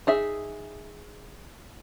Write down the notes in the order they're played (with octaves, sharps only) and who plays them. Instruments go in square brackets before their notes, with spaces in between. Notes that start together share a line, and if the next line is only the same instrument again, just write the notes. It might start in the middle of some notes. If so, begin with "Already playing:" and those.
[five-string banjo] D#4 G#4 E5